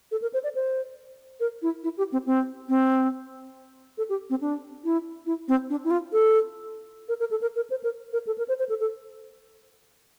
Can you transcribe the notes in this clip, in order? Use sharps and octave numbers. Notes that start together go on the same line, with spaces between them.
A4
A#4
C5
D5
C5
A#4
E4
E4
G4
C4
C4
C4
A4
G4
C4
D4
E4
E4
C4
D4
E4
F4
A4
A#4
A#4
A4
A#4
A#4
C5
A#4
A#4
A4
A#4
C5
C5
A4
A4